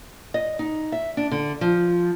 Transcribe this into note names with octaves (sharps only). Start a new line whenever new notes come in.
D#5
D#4
E5
D4
D3
F3